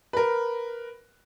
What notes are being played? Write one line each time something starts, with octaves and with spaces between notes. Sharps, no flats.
A#4 B4